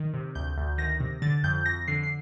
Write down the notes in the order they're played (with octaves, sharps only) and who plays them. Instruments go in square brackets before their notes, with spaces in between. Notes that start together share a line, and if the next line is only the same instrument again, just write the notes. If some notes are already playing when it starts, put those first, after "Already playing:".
Already playing: [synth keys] D#3
C3
D2 G6
D2
D#3 A#6
C3
D3 A6
F2 G6
F2 A#6
D3 C7
C7